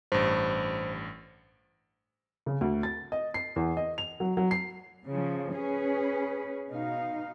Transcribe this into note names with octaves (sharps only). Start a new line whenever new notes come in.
A1 G2 C5
C#3
D2
A6
D#5
C7
E2
D#5
F7
F#3
F#3
C7
C#3 F3
C#4 G#4 B4
B2 D#4 F5